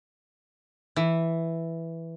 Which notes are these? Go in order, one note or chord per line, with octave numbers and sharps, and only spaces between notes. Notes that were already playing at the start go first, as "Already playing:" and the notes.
E3